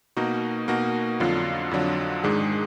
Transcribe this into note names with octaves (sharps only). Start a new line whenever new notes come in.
B2 A#3 D#4 F#4
B2 A#3 D#4 F#4
F2 D3 F#3 D4 F4
F2 D3 F#3 D4 F4
G#2 D#3 G#3 D4 G#4